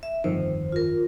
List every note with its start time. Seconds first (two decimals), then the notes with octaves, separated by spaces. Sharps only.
0.03 E5
0.24 G1 F2 D#3 C5
0.72 F4 A#4